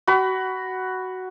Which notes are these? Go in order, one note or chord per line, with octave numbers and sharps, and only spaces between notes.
F#4 B5